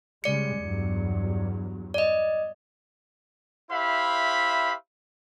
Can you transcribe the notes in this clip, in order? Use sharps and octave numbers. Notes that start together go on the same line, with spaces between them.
C#3 G3 G#3 D5 C#7
E2 G2 F#3
D5 D#5
E4 G4 C5 E5 F5 B5